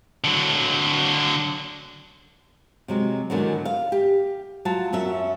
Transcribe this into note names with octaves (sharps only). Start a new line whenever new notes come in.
D3 F#3
C3 F#3 G#3
E2 G#2 D3 D#3 F#3
F5
G4
F#3 F4 A5
F#2 F#3 C#4 E5